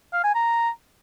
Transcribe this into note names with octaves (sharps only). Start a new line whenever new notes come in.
F5
G#5
A#5